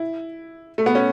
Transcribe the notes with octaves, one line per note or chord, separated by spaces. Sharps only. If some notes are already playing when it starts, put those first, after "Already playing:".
Already playing: E4
A3
B3
C#4